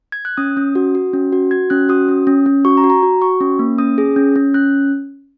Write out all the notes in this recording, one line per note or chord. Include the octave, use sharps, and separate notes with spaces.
G#6
F#6
C#4 D#6
C#4
F#4
F#4
C#4
F#4
F#4 G#6
C#4 F#6
F#4 D#6
C#4
C#4
C#4
F#4 C#6
A#5
F#4
A#5
F#4
F#4 C#6
C#4
A#3
C#4 D#6
G#4
C#4
C#4
C#4 F#6